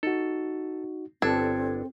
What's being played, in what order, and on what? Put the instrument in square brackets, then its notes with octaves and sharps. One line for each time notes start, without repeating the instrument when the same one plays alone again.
[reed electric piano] D#4 F#4 [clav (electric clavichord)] A4
[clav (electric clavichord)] G1 D4 [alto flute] C4 [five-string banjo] A4 [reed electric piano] G#6